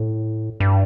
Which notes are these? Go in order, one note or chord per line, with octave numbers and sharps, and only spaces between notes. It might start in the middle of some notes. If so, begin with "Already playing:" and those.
Already playing: A2
G2